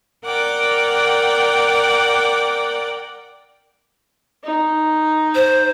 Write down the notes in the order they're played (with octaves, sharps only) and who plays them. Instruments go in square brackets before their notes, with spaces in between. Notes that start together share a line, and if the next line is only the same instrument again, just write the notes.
[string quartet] A#4 D5 F#5 G5 D6
[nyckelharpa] D#4
[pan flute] C5